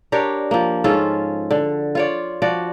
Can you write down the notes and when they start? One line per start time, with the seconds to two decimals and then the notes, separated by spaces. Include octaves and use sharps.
0.12 D4 G4 A#4 C#5
0.51 F3 A#3
0.84 G#2 C#4 F4 A4
1.51 D3
1.95 F4 C#5 D5
2.42 F3 F#4 D5